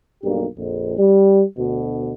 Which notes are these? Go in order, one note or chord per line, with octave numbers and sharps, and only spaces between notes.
B1 G2 A#3 G4
A#1 F2
G3
D2 B2